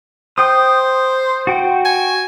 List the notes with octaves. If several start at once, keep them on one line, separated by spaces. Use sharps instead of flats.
C5 G5 D#6
F#4 G5
G#5